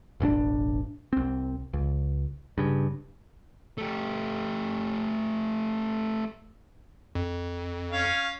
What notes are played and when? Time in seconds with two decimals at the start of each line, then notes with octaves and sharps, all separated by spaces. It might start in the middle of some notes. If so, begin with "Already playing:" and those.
0.20 E1 A1 C#4 D4
1.13 C2 C4
1.73 C#2
2.58 G2 C#3
3.78 A3 G4
7.15 F2
7.92 C#4 F5